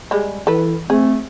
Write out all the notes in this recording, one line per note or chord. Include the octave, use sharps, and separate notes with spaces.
G3 G#3
E3 A4 B4
A3 C4 G#4